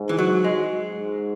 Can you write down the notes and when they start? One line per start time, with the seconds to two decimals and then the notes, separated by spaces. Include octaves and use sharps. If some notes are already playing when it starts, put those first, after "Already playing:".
Already playing: G#2
0.09 E3
0.19 F#3
0.44 G#3
0.94 G#2